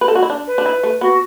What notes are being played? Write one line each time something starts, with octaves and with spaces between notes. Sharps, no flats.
B4
A4
F#4
E4
D4
B4
D4
E4
A3
B3 F#4